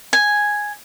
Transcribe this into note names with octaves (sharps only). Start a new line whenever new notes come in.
G#5